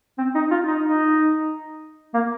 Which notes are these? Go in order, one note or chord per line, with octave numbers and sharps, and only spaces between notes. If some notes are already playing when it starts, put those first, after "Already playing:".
C4
D#4
F4
D#4
D#4
A#3